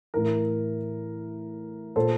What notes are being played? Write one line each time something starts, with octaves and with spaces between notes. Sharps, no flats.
A2 E3 A#4
A#2 A4 C5